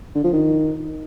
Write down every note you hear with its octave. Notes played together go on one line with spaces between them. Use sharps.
D3
F3
D#3